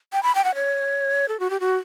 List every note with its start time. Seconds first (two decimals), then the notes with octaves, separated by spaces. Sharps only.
0.13 G5
0.23 B5
0.35 G5
0.44 F#5
0.55 C#5
1.28 A4
1.40 F#4
1.50 G4
1.60 F#4